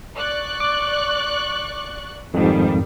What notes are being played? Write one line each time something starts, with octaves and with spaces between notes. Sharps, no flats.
D5 C#6 F#6
D6
F2 G#2 D#3 G3